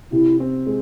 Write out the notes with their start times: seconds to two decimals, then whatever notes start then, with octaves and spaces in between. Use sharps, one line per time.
0.12 C3 E4
0.40 C4
0.67 G#3